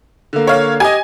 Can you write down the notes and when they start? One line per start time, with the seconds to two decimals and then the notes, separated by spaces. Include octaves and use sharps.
0.33 D3 A#3
0.47 C#5 F5
0.80 G4 D#5 G#5